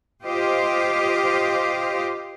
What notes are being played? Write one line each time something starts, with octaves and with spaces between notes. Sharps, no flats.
F4 G4 C5 D#5 F5